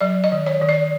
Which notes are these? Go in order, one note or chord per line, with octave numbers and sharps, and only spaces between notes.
F#3 D5
D#5
D#3
C#5
D#3
D5